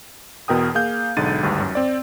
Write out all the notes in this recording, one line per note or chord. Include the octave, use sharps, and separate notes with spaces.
E2 B2 A#4 G5 D#6
A#3 G#4 F5 G6
B1 G#2 D3 A6 D#7
G#1 D2 G2
F#2
C4 D5